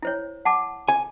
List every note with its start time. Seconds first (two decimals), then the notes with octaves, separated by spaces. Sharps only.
0.02 E4 C5 C#5
0.45 F#5 A5 D6
0.88 G#5